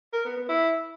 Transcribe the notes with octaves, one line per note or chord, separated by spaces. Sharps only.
A#4
B3
B3
E4